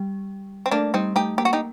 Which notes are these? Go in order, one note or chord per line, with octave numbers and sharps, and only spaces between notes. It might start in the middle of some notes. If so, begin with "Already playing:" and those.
Already playing: G3
C4
A3 A#3 D4
G3 C4 D#4
A3 D#4 G4
A#3 G4
F#4
D#4 G4